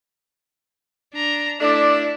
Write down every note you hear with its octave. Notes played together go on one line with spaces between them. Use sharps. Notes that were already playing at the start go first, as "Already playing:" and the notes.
D4 A#5
A3 D4 E4 D5